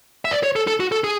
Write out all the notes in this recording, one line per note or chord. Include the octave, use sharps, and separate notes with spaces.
E5
D5
C#5
A4
A4
F#4
A4
G#4